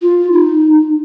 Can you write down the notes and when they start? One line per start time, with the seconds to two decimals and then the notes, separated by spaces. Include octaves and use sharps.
0.02 F4
0.33 D#4